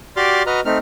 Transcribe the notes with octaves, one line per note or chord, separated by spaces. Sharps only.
F#4 G4 D5 C6 D6 F6
F#4 B4 D#5 A#5 F6
A3 C4 D#4 F6